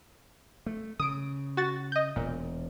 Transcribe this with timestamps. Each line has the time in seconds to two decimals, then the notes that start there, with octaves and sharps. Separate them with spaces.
0.66 A3
1.00 C#3 D#6 D7
1.57 F#4 A6
1.92 D#5 G6
2.16 E1 A#2